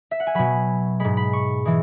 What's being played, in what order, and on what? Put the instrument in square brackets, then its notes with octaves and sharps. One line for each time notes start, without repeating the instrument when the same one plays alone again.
[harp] E5
F#5
G#5
B2 F#3 B5
G#2 G#3 B5
B5
C#6
E3 G#3